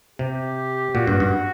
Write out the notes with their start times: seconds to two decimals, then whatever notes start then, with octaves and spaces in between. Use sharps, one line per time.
0.19 C3 G4
0.94 A#2 F#4
1.07 G2
1.20 G2